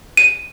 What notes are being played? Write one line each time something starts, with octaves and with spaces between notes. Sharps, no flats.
D#7